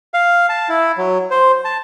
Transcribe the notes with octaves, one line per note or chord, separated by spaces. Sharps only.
F5
A5
E4
F#3
C5
A5